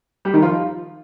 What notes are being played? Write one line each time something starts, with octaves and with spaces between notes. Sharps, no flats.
G3 G4
D#3 D#4
F3 F4